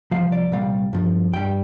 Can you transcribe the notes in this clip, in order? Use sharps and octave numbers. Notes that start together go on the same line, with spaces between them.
C2 A#2 F3 F5
D5
C2 A#2 G3 F5
G2 F3
G2 G3 G5